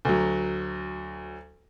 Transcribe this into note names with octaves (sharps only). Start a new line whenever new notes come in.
D2 F#3